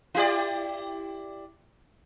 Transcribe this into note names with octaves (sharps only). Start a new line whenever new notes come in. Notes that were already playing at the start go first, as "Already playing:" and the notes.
E4 G4 D5